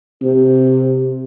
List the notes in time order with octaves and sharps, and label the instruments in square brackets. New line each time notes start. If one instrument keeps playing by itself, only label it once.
[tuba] C3